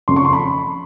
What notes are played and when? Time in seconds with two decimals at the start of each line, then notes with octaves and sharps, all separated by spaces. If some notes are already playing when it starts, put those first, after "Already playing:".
0.08 F#1 F2 C#3 F3 C6
0.16 C#6
0.25 C6
0.33 B5